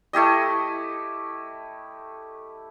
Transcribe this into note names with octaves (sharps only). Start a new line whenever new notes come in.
A3 E4 G4 D#5